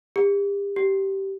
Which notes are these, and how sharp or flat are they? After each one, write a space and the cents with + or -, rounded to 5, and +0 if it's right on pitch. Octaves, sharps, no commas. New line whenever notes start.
G4 +40
G4 -15